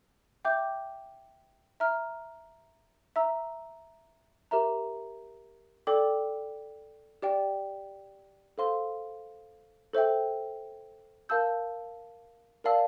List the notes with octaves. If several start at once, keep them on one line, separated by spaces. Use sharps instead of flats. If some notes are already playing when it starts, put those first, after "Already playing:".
E5 G5 D6 G6
E5 A#5 F6
E5 A#5 E6
G4 A#4 E5 A#5
A4 D5 G5 D6
G4 D5 G5
A4 C5 F5 C6
A4 C5 E5 G5
A#4 F5 A5 E6 G6
A#4 D5 F5 A5 E6